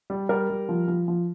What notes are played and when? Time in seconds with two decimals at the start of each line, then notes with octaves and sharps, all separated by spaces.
0.10 G3
0.29 G3 A#4
0.50 G3
0.69 F3
0.88 F3
1.08 F3